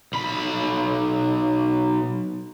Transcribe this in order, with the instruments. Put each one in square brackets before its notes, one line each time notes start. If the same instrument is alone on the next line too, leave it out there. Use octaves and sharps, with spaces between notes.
[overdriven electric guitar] B1 B5